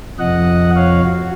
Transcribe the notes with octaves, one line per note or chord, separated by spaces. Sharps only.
F2 C3 F3 D#5 F#5
C#5 F5
F#4